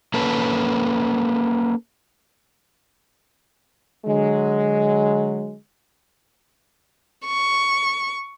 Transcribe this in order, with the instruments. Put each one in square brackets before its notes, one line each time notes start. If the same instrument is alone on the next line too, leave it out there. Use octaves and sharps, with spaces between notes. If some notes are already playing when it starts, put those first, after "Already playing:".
[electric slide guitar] A#3 C#4 A4 B4
[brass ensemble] D3 F#3 G#3
[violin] C#6